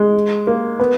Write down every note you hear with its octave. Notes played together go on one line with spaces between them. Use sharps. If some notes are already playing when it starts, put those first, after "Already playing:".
Already playing: G#3
A#3
B3